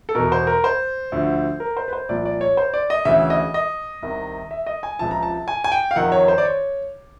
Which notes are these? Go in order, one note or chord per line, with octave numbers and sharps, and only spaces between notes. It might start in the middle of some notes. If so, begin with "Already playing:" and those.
A4
E2 B2 A#4
C5
A#4
C5
D2 D3 F3
A#4
C5
B4
C5
C2 A#2 F3 D5
D5
C#5
C5
D5
D#5
D2 C#3 E3 E5
D#5
D#5
C2 C3 D#3
E5
D#5
G#5
C#2 C3 F3 A5
A#5
A5
G#5
G#5
G5
F5
F2 C3 D#3 F#5
C#5
C5
D5
C#5